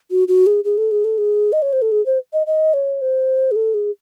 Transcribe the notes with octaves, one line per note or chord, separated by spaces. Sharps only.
F#4
F#4
G#4
G#4
A4
G#4
A4
G#4
D#5
C#5
C5
A4
G#4
C5
D#5
D#5
C#5
C5
G#4
A4
G#4